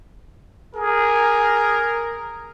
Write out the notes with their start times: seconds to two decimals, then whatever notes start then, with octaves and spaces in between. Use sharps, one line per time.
0.76 G#4 A#4